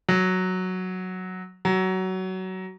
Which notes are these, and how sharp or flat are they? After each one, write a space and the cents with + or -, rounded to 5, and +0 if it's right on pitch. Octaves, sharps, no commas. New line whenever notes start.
F#3 +0
F#3 +20